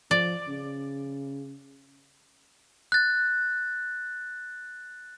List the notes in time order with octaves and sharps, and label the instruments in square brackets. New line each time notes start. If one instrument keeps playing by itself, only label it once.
[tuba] F3 [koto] D5
[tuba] C#3
[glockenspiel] F#6 A6